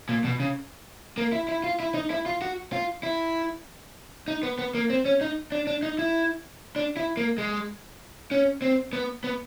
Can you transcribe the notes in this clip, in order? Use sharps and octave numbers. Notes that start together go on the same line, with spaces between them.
A#2
B2
C#3
A#3
E4
E4
F4
E4
D#4
E4
F4
F#4
F4
E4
D#4
B3
B3
A#3
C4
C#4
D#4
D4
D4
D#4
E4
D4
E4
A#3
G#3
C#4
C4
B3
B3